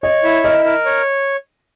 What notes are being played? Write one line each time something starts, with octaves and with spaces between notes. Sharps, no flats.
C#5 D#5
E4
A#4 D#5
A#4
C#5